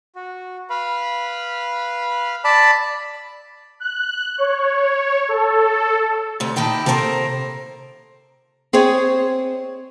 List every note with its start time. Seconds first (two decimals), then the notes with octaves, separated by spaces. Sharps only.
0.16 F#4
0.70 B4 F5 B5
2.44 D5 A5 B5 E6
3.80 F#6
4.38 C#5
5.29 A4
6.40 D2 C3
6.56 A#2 D#3 E4 G5 A5
6.86 C3 A#3 A4 A#4 C5
8.73 C4 G#4 C5 C#5 D#5